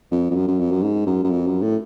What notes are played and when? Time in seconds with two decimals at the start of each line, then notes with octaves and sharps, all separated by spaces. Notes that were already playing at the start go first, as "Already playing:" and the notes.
0.11 F2
0.31 F2
0.35 F#2
0.47 F#2
0.59 F2
0.71 F#2
0.82 G#2
1.06 F#2
1.24 F#2
1.30 F2
1.46 F#2
1.62 A2